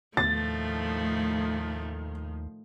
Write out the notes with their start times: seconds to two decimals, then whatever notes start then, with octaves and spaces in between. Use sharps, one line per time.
0.17 D#2 A2 D#3 F3 A3 A6